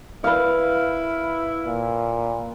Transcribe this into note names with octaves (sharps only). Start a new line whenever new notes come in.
E4 B4 F5
A#2